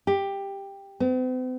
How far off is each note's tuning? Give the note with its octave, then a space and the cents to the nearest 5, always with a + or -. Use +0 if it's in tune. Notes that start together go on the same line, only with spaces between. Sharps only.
G4 +10
C4 -45